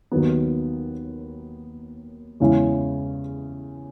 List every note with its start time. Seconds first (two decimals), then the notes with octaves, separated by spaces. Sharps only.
0.11 D#2 D#3 F#3 B3
2.40 E2 C#3 G#3 C#4 E4